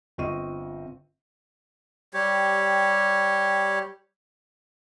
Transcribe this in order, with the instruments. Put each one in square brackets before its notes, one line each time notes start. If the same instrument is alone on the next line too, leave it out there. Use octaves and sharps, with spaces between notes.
[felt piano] G1 C4 F4 D#5 C#6 D#7
[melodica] G3 G4 C#5